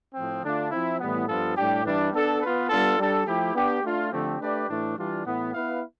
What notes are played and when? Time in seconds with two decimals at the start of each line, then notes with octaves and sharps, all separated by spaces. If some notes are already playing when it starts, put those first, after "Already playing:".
0.14 A2 F3 C4
0.43 D3 A3 D4 F4
0.71 F3 C4 E4
0.99 A2 E3 G3 B3
1.28 G2 F3 B3 F4 A4
1.57 A2 G3 D4 G4
1.85 G2 E3 G3 D4
2.13 B3 D4 A4
2.42 B3 F4 B4
2.69 G3 B3 D4 F4 A4
2.98 G3 D4 A4
3.27 F3 A3 E4 G4
3.55 B3 D4 G4
3.84 A3 D4 F4
4.12 D3 F3 A3 C4 G4
4.40 A3 D4 G4 B4 D5
4.69 A2 E3 A3 D4
4.97 E3 G3 D4 F4
5.26 A2 E3 B3
5.54 B3 E4 B4 F5